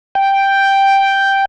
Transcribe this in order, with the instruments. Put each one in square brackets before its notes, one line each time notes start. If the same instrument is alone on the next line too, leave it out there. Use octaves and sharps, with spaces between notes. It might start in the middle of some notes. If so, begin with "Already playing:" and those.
[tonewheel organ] G5